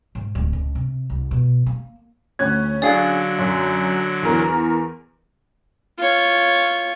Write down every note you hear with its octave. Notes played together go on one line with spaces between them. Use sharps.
G#2
D1
C#2
C3
C2
B2
A#3
D2 C#4 F#6 G#6
D3 F#3 D4 G#4 D5 F5
F#2 C6
E2 A#4
F4 C#5